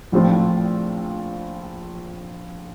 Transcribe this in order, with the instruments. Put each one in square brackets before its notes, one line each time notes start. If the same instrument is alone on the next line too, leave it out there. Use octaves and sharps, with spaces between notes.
[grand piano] A#1 A2 F3 C4 F4